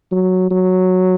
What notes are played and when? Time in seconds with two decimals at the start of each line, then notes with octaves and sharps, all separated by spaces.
0.12 F#3
0.51 F#3